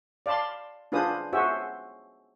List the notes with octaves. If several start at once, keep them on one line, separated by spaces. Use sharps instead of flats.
D5 F5 A5 B5 C6
D4 F4 G#4 B4 C5 D#6
F#4 G#4 C5 E5